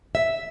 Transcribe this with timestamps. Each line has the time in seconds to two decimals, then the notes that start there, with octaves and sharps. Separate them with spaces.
0.15 E5